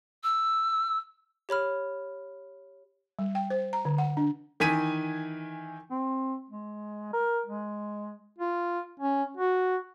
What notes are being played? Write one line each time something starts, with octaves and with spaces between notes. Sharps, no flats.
E6
G4 C#5 B5 F6
G3
G5
C5
A#5
D3
F#5
D4
D#3 E3 G#5 B6 D#7
C4
G#3
A#4
G#3
F4
C#4
F#4